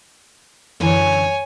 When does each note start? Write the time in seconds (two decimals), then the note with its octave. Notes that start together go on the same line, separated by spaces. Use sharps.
0.80 F#2 D3 E3 C#5 G#5